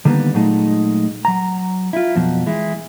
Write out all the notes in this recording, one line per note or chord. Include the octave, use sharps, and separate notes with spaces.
D3 D#3 G3 A#3 B3
A#2 F#3 G#3 A3 D#4
F#3 A#5
E4 F4
F2 B2 F3 F#3
E3 G#3 E4